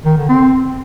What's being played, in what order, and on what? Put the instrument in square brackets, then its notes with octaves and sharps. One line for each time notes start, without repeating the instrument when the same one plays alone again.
[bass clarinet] D#3
D3
C4